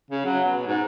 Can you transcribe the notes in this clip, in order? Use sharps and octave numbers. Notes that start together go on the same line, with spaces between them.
C#3
F#3
B2
G#2